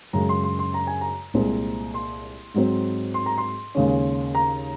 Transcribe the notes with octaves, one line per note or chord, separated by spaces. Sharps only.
F#2 C#3 G#3 A#5
C6
C6
C6
A#5
G#5
A#5
C2 A#2 G#3 C4
C6
G#2 F#3 C4
C6
A#5
C6
D#2 C#3 G#3 C#4
A#5